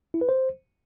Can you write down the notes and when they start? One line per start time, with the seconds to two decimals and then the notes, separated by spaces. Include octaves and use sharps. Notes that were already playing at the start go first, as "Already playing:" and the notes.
0.14 E4
0.21 B4
0.29 C5